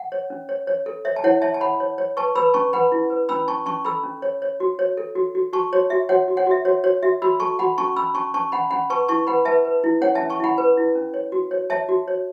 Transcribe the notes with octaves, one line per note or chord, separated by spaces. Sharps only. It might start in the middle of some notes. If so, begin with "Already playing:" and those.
Already playing: F#5
C#5
C#4
C#5
C#5
A4
C#5 E5
A5
E4 C#5 F#5
C#5 E5 A5
A5
C#5 F#5 B5
C#5
C#5
B4 A5 C#6
B4 B5 E6
C#4 A5 C#6
B4 F#5 B5
E4
B4
C#4 B5 E6
C#4 A5 C#6
C#4 A5 C#6
A4 B5 E6
C#4
C#5
C#5
F#4
C#5
A4
F#4
F#4
F#4 A5 C#6
F#4 C#5
F#4 E5
F#4 C#5 F#5
F#4
C#5 F#5
F#4 E5
F#4 C#5
F#4 C#5
F#4 E5
F#4 B5 E6
A4 A5 C#6
F#4 F#5 B5
C#4 A5 C#6
C#4 B5 E6
C#4 A5 C#6
C#4 A5 C#6
C#4 F#5 B5
C#4 F#5 B5
B4 A5 C#6
E4 A5 C#6
B4 F#5 B5
B4 E5 A5
B4
E4
C#4 C#5 F#5
E5 A5
C#4
A5 C#6
E4 F#5 B5
B4
E4
C#4
C#5
F#4
C#5
C#5 E5 A5
F#4
C#5